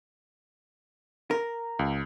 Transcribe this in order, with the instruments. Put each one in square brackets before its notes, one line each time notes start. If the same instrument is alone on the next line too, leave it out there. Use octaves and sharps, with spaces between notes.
[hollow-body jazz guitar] A#4
[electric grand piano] C#2